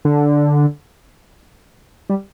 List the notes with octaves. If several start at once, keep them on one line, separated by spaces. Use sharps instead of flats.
D3
G3